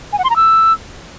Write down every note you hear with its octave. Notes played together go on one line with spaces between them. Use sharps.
G#5
F#5
C6
A#5
E6